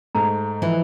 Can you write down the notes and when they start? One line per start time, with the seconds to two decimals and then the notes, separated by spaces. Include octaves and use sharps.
0.15 G#2 A3 A#5
0.62 E3 F3 E4